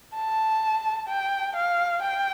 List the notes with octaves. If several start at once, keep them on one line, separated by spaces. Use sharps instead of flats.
A5
G5
F5
G5